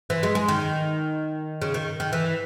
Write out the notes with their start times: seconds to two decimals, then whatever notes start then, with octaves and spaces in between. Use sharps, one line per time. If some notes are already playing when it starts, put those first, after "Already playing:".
0.10 E3
0.23 G#3
0.35 G#3
0.48 D#3
1.62 C#3
1.74 D#3
2.00 D#3
2.13 E3